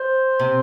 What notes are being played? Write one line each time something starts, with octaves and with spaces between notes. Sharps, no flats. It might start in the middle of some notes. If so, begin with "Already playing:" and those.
Already playing: C5
C3